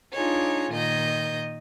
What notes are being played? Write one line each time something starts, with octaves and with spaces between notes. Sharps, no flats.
D4 D#4 F4 G#4 C#5
A#2 D#3 D#5 G6